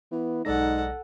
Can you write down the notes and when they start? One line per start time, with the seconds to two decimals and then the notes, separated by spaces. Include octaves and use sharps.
0.11 E3 B3
0.45 B1 G#2 D#4 A4 D5 F#5 A#6